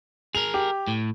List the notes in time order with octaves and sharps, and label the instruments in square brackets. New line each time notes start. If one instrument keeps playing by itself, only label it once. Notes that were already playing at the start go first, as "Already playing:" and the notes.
[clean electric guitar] G#4 A#4 [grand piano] F7
[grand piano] G4
[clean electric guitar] A2